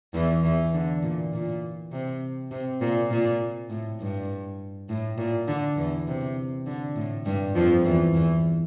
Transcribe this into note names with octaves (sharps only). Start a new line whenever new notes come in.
E2 E3
E2 E3
D3
A#2
A#2
C3
C3
A#2
A#2
A2
G2
A2
A#2
D3
E2 E3
C3
D3
A2
G2 G3
F2 F3
E2 E3
E2 E3